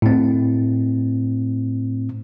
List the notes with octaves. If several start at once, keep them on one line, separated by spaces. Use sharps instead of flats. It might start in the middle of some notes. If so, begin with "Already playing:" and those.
A2 C4